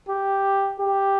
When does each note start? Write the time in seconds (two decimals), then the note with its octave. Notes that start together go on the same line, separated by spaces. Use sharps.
0.09 G4
0.80 G4